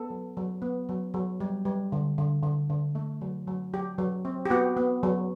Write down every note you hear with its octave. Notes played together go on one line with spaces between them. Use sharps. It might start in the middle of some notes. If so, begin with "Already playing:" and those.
Already playing: B3 A4
F#3
F#3
B3
F#3
F#3
G3
G3
D3
D3
D3
D3
A3
F#3
F#3
F#3 G4
F#3
C4
G4
B3 F#4
B3
F#3